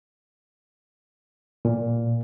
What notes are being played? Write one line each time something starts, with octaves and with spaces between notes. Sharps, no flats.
A#2